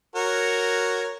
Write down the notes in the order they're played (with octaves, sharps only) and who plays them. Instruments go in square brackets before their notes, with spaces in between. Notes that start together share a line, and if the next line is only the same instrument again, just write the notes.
[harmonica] F#4 A#4 C#5